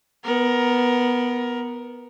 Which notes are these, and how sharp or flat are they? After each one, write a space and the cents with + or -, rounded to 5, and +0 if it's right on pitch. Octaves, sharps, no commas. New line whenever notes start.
B3 +0 A#4 +15